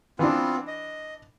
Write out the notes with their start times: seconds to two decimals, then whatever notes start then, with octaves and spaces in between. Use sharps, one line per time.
0.19 E3 B3 C4 D4 F4
0.67 D#5